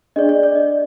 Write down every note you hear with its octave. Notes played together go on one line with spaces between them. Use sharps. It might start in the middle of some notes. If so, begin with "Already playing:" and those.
D4 G#4 D5 D#5
D5
D5
D#5